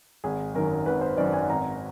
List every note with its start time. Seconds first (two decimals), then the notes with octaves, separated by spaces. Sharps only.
0.24 G#1 G#4
0.54 F#2 D#3 A#4
0.86 G#1 B4
1.01 C5
1.18 F#2 D#3 D5
1.33 G#5
1.49 G#1 A#5